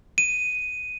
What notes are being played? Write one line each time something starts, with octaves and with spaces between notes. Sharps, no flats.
D#7